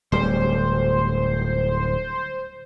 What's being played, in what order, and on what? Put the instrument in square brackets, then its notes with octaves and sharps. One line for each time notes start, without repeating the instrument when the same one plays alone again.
[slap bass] D1 G3 [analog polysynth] C5